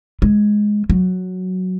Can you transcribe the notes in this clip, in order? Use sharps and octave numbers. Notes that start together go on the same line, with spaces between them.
G#3
F#3